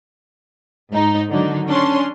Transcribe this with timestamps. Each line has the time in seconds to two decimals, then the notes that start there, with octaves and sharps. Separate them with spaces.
0.91 G#2 D#4
1.31 D3 D#3 F#3 D4 D#4
1.66 C#4 D4 C6